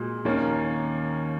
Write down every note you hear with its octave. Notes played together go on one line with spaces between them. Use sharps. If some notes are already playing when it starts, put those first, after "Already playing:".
Already playing: A#2 G#3 F#4
D#2 D#3 A#3 C#4